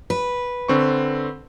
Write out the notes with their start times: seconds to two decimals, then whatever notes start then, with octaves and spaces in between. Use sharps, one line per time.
0.10 B4
0.68 D3 C4 C#6